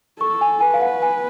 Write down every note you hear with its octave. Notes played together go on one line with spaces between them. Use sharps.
A4 C#6
G#5
B4 G#5
F5
F#5
G#5